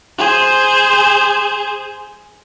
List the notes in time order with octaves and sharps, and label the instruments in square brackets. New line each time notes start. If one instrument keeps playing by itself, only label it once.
[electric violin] G#4 C5